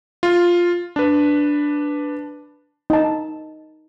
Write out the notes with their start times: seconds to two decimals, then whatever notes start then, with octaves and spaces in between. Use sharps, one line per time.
0.23 F4
0.96 D4 B4
2.90 D#4 A5